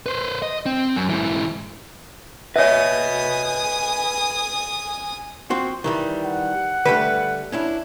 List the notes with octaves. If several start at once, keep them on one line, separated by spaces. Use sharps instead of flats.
B4 C5
D#5
C4
F#2
G#2 E3
B4 C#5 D#5 E5 G#5 D#6
F3 C4 F#4
D#3 E3 G3
F#5
D3 G3 A3 B4
C#4 D4 E4